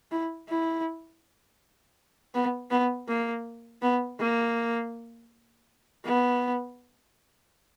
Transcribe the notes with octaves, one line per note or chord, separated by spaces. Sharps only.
E4
E4
B3
B3
A#3
B3
A#3
B3